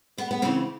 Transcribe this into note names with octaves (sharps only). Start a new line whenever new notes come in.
D2 B3
B3
C#3 E3 C4